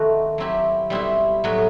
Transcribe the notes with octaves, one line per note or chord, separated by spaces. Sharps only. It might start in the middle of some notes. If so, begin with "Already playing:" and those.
Already playing: D#3 A3 C4 D#4 F#4
F#3 C4 E4 G4
B2 G3 C4 E4
A2 F#3 B3